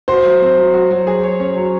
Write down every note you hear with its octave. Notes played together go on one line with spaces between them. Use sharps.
F#4 C5
F#3
C4
F#3
F#4
F#3
G#4
C#5
C#4
F#3